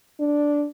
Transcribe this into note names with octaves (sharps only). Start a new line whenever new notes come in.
D4